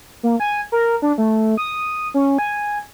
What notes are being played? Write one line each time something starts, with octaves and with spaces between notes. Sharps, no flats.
A#3
G#5
A#4
D4
A3
D#6
C#4
G#5